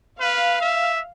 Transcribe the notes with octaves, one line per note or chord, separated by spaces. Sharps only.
B4 F5
E5